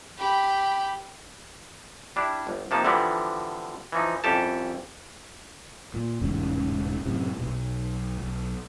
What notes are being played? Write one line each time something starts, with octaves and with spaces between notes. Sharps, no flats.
G4 B5
G3 D4 E4
G1
C3 F3 A#3 D#4 A5
D3 E3 F3 G3 B3 D4
E3 F3 D#4
C2 F2 C#4 G4 A4 A5
A#2
E1 A1 G#2 C#3
F#2 A2 C3
B1 B2
B1